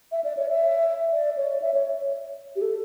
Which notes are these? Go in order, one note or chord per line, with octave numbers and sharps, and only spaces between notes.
E5
D5
C#5
E5
D5
C#5
E5
C#5
G4
A4